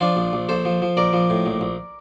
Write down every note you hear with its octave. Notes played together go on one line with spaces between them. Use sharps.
F3 D4 F4
A#1
A#1
A#1 A4 C5
F3
F3
A#1 A#4 D5
F3
A2
A#1
A#1